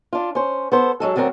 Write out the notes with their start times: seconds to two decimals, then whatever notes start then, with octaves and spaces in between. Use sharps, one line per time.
0.13 D4 F4
0.35 C#4 C5
0.72 B3 A4 C5
1.00 F#3 G#3 A4
1.16 D2 D3 F#3 C4 A#4